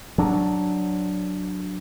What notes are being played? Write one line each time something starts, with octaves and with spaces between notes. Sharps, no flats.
F#3 D4